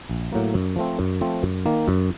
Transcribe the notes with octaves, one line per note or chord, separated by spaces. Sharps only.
A#1
A2 F#3 A#3
F#2
F3 A3 C4
F#2
F3 A3 C4
F#2
D#3 A#3
F#2